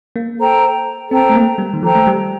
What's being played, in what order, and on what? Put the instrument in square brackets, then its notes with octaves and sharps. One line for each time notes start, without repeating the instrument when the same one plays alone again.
[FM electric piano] A#3
[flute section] A4 C5 G5 A#5
[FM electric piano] C4 [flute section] A4 C5 G5 A#5
[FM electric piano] A3
A#3
G3
D#3
[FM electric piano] F3 [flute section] A4 C5 G5 A#5
[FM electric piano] A3
G3